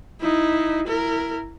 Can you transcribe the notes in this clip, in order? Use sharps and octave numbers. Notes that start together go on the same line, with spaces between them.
D#4 E4
E4 A#4